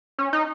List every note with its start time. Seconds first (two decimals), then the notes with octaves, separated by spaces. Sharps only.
0.18 C#4
0.33 D#4